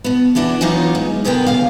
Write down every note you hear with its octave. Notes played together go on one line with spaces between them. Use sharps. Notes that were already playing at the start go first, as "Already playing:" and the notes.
B2 B3
E3 B3 D4 F#4
E3 F#3 B3 D#4 F4 C#5
G#3
B2 D3 B3 A#4 G5
D2 C#3 F5